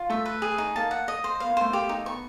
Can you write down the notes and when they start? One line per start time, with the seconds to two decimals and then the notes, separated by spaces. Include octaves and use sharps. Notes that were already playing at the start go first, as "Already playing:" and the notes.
Already playing: F4
0.10 A3 E5
0.26 B4
0.42 G#4
0.58 D#4
0.76 A#3 A5
0.91 F#5
1.08 D#5
1.24 C5
1.40 B3 F5
1.50 A#3
1.57 A3 C5
1.70 A#3 G4
1.89 D#4
2.06 B3 C#6